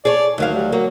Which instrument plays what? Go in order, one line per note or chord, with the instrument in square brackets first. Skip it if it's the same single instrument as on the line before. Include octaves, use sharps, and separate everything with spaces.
[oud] G#4 C#5 [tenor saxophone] D5
[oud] D2 F#3 F5 [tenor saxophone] D#3
[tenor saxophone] G3
[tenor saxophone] F#3 [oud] A#3